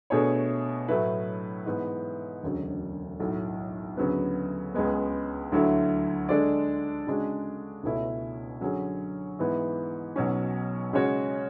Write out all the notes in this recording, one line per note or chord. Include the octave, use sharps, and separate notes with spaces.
B2 A3 D4 G#4 C#5
A2 F#3 A3 E4 B4
G#2 E3 B3
E1 D2 C#3 F#3
B1 A2 F#3 A3
D2 C#3 F#3 B3
C#2 C#3 G#3 B3
D2 D3 F#3 A3 E4
D3 G#3 D4 A4 D5
C#3 G#3 D4 F#4
C#2 B2 A3 C#4 E4
D3 F#3 C#4 G#4
G#2 E3 B3
B1 B2 F#3 C#4
C#3 G#3 C#4 F#4 C#5